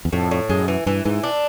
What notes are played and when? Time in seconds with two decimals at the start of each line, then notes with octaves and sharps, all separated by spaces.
0.05 E2
0.13 F2 A2
0.31 A2
0.49 F#2 G#3
0.68 E3
0.86 G2 E3
1.05 G#2 E3
1.23 D4